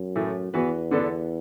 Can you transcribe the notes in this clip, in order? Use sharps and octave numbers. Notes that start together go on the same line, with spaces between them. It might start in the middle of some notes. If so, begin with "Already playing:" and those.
Already playing: F#2
A2 E3 A3
E2 E3 B3 F#4 B4
D3 B3 D4 A4